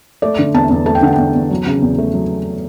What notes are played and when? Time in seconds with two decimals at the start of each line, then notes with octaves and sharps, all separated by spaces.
0.22 A3 D5
0.39 D3
0.54 E2 A5
0.70 E2
0.86 A3 A5
0.95 G5
1.02 D3 F#5
1.13 G5
1.18 E2
1.35 E2
1.51 F#3
1.67 C#3
1.82 E2
1.98 A3
2.14 F#3